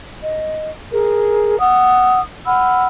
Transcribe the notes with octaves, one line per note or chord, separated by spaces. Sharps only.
D#5
G#4 A#4
F#5 D#6 E6
F#5 B5 E6 F6